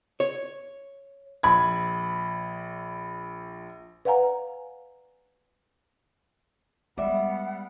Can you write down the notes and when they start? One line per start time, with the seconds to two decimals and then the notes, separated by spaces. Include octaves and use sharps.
0.20 C#5
1.43 A#1 B5 G#6
4.05 B4 D5 F5 F#5 G#5 A#5
6.98 G3 G#3 B3 D5 E5 F#5